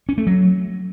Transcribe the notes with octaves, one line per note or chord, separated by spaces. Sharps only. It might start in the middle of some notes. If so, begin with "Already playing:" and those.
C#4
A3
F#3